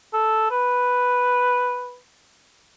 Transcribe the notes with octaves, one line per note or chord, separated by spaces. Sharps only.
A4
B4